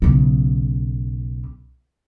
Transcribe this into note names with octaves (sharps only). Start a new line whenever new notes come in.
B1 C#3